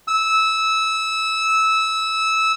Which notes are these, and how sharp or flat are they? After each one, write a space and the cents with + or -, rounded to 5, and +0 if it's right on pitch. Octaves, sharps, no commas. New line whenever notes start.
E6 -15